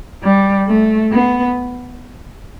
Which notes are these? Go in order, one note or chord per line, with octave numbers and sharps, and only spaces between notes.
G3
A3
B3